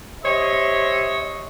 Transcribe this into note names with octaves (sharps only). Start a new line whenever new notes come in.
G4 C5 C#5 D#5 E5